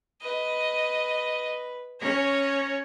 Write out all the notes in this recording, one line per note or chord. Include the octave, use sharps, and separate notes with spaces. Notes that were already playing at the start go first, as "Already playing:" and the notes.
B4 D#5
C#4 C#5 A#5